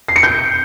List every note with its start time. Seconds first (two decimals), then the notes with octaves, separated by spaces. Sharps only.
0.08 C7
0.16 C#7
0.23 G6